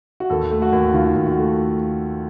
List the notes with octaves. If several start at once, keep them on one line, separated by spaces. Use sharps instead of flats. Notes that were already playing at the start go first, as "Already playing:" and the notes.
F#4
D#2 A4
A3
F#4
D#2
D#3 F4
D#2
F#4
A3